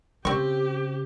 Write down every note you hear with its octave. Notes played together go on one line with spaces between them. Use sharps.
C#3 C4 G4 C#6